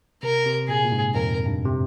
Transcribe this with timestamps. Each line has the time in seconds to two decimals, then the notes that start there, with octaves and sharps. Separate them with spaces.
0.23 C3 A#4
0.46 C3
0.68 A#2 G#4
0.85 A#2
0.92 G#2
1.15 F2 A#4
1.45 G2
1.65 C3